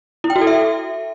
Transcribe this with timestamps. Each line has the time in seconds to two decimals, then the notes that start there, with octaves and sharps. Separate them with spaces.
0.24 E4
0.30 G5
0.36 F#4
0.41 A4
0.47 E5